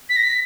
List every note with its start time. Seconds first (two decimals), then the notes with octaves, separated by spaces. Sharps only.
0.09 B6
0.16 A#6
0.23 B6